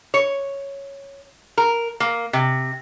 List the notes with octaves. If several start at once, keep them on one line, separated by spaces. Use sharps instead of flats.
C#5
A#4
A#3
C3